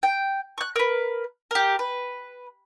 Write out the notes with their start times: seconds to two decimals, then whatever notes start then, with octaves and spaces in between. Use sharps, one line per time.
0.03 G5
0.58 C#6 F#6
0.76 A#4 B4
1.51 G4 A#4
1.79 B4